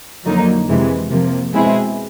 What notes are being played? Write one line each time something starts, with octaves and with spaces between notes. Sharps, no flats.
F2 D3 F#3 A#3 D#4
F2 C3 E3 G#3
C3 F3 A#3
B2 G#3 C4 E4 G#4